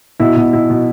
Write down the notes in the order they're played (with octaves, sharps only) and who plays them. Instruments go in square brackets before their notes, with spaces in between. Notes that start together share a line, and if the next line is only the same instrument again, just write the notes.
[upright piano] B2 E4
B2
B2 E4
B2